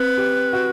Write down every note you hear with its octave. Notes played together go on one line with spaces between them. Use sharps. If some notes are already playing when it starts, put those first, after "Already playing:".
Already playing: C4 B4
G4
F#4